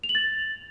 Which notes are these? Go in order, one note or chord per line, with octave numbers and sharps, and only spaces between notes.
F7
F#7
A6